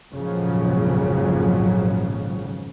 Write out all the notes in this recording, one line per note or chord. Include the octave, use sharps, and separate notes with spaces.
G#1 F2 A#2 C#3 F3 F#3